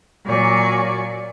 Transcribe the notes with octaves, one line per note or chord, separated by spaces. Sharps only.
A#2 F#3 D5 G#5 C#6